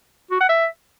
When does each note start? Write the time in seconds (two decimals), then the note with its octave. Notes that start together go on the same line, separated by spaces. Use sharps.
0.31 F#4
0.40 F#5
0.49 E5